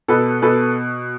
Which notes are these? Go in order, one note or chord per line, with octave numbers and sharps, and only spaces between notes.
B2 A4 B4
B2 A4 B4